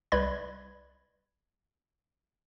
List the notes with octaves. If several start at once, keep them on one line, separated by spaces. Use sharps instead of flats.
C2 B4 D5 B5 G#6